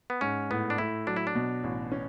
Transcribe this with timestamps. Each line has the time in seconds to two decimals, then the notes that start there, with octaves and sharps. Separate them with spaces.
0.10 B3
0.21 G#2 C#4
0.50 A2 B3
0.70 D4
0.78 A2 E4
1.07 F#3 D4
1.16 E4
1.27 D4
1.35 B2
1.64 A1
1.92 C#4